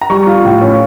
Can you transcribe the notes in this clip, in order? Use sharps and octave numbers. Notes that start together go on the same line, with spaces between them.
A#5
G3 C#6
F4
A2
C#4